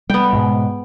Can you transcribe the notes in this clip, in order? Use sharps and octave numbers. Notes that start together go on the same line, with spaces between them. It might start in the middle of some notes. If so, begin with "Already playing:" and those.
G3 B3 G5
G#2 B2